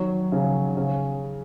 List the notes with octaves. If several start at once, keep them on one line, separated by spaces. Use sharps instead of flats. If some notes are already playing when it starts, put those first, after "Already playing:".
Already playing: D#3 F#3
C#3
C#3